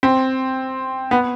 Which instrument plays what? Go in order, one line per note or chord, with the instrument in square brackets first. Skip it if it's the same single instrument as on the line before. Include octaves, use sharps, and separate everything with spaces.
[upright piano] C4
B3